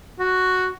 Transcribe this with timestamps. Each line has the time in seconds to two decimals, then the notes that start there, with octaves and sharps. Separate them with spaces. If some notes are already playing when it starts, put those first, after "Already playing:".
0.19 F#4